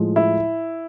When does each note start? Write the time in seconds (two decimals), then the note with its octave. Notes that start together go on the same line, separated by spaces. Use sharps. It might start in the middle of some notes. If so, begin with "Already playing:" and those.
Already playing: A2 F3 G#3
0.16 E4